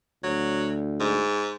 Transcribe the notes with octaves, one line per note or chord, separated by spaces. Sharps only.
D2 F#3
G#2